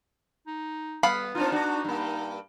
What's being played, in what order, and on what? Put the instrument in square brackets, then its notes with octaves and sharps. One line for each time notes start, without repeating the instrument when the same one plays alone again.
[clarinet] D#4
[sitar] G3 [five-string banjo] B3 F5 B5
[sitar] C4 D4 F4 [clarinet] D#4
[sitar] D4 F#4
G2 A#3